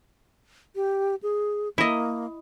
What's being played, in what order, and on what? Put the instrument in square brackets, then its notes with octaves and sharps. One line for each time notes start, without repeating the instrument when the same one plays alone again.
[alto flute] G4
G#4
[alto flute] A#3 [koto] E4 D#5